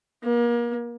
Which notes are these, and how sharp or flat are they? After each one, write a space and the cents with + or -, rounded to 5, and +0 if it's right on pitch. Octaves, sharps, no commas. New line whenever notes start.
A#3 +35